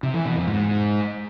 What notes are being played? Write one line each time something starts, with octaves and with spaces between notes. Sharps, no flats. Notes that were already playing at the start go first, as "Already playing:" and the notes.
C3
E3
B2
F2
G#2